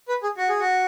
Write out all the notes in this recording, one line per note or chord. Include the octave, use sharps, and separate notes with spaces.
B4
G#4
F#4
G#4
F#4